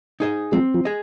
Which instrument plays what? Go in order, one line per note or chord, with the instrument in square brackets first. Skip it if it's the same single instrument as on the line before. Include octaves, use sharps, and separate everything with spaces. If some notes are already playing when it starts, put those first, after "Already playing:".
[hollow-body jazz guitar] D#4 G#4 D#5
[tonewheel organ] F3 G#3 [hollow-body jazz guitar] C4
[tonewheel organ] F3
[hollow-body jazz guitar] G#4 D#5